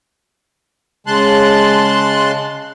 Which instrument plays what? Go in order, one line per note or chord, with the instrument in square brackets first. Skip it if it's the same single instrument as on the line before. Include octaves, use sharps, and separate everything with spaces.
[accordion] C#3 G#3 A5 C6 F#6